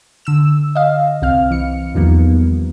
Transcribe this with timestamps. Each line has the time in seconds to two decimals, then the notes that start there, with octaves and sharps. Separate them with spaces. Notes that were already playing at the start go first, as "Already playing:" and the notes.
0.25 D3 E6 E7
0.75 D#5 F5
1.22 C2 C4 F5 F6
1.51 E3 C#7
1.95 E2 D#3 F3 G3 A#3 B3